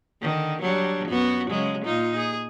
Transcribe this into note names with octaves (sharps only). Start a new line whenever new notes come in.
D3 D#3
F#3 G3 D4
F#2 B3 F#4
C#3 F#3 G#3
A#2 D#4 F4
G#4